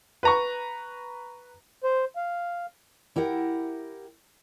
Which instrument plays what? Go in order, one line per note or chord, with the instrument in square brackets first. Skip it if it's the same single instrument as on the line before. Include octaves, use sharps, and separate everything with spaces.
[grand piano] B4 A#5 C#6
[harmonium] C5
F5
[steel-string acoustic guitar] E4 G4 A#4 F#5